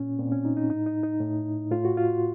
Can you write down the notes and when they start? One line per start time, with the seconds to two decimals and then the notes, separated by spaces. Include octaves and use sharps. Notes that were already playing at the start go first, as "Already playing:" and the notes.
Already playing: A#2 C#4
0.19 A#2 C4
0.32 C#4
0.45 D#4
0.57 D#4
0.70 A2 D#4
0.86 D#4
1.03 D#4
1.20 A2
1.71 A2 F4
1.85 F#4
1.97 F4